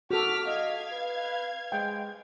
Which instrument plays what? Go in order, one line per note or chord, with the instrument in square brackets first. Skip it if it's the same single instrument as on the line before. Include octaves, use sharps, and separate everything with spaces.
[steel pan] F#4 A4 [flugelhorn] F#5 [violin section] D6 F6 B6
[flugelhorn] D#5 [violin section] F5 G#6
[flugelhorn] B4
[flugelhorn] G#3 [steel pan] G5